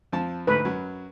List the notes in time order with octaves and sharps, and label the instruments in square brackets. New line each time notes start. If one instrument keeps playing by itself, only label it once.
[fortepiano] F2 F3 A5
[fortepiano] D2 G#2 A3 [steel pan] B4
[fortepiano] F#2 F#3